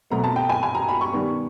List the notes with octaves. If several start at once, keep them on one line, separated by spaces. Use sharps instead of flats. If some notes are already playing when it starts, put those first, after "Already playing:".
B2 F#3 A3 C4 A#5
A5
G5
G#5
G#5
A#5
B5
C#6
D#3 G3 B3